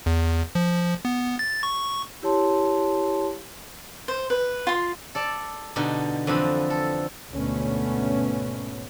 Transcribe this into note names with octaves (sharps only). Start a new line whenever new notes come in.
E2
F3
B3
A6
C#6
E4 G4 C#5 A5 C6
C5
B4
F4 C6
A4 D5 A5
B2 D3 D#4 G4
F2 D3 E3 C4 B4 B5
A4
D2 G#2 B2 A3 B3 C#4